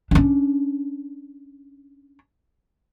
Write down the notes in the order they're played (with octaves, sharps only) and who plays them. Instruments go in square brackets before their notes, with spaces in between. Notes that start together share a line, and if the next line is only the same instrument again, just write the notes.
[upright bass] C#4 D4